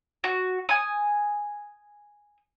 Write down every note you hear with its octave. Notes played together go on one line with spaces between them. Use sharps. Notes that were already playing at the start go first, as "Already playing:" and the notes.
F#4
G#5 D#6